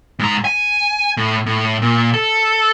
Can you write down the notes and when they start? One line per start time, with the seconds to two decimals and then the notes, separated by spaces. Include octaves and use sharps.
0.19 G#2 A#5
0.45 G#5
1.17 A2
1.46 A2
1.82 A#2
2.14 A4